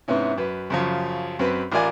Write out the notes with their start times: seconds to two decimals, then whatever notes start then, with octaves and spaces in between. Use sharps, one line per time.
0.08 G#2 C3 B3 C#4 E4
0.37 F#2 B4
0.70 F#2 C#3 F3
1.39 F#2 C4 B4 B5
1.71 A1 F4 A#4 D5 G#5